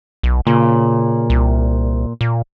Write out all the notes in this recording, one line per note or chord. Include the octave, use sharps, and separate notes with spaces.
B1
A#2 C#3
C2
A#2